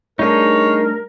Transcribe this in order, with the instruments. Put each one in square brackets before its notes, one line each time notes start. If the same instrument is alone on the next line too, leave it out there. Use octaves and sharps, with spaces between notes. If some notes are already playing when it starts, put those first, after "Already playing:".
[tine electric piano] G3 A3 D4 [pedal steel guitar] D#4 G#4 [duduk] A#4 [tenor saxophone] C#5